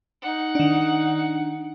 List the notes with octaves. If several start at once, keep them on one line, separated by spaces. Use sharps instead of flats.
D#4 F#5
D#3 D4